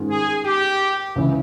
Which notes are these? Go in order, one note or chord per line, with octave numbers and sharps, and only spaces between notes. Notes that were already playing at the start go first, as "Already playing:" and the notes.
Already playing: G#2 D#3 G#3 C#4 F4
G#4
G4
C#2 C#3 E3